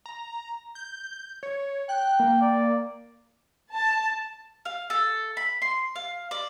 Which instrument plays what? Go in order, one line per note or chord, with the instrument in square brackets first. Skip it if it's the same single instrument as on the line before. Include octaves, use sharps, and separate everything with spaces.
[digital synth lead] A#5
G6
C#5
[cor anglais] G5 [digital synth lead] F#6
[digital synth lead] A#3
[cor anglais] D5
[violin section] A5
[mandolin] F5
A4
B5
C6
F5
D5